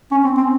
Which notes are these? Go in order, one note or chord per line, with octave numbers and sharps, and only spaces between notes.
C#4
C4
C4